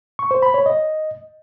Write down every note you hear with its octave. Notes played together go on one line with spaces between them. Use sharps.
C#6
C5
B5
C#5
D#5